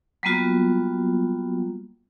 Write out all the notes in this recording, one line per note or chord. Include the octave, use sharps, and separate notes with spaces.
F#3 G3 A#3 B3 F4 F#4